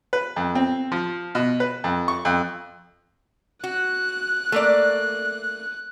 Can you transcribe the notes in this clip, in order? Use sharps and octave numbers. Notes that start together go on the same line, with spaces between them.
B4
F2
C4
F3
B2
B4
F2
C#6
F2
F#4 F#6
A3 A#3 D5